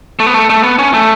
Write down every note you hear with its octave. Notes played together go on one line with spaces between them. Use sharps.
A3
B3
A3
A3
B3
C#4
A3